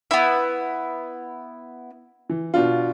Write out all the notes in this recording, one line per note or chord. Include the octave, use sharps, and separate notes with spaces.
B3 E4
E3
B2 D4 F4